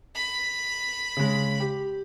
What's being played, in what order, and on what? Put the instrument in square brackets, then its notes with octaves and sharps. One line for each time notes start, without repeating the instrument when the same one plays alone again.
[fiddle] B5
[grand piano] C#3 G#3
G4